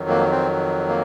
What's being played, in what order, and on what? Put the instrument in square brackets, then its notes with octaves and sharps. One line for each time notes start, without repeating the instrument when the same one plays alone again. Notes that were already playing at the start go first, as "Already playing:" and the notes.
Already playing: [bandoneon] F2 D#3 F#3
A#3
C4
A#3